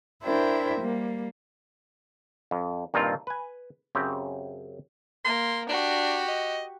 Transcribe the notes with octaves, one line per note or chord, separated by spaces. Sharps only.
D4 E4 A#4 C5 E5 G5
G3 A#3
F2
G2 A#2 D#3 C4 F4
B4 G#5
F#2 C#3 C4 G4
A#3 C6
D4 F#4 G4
D#5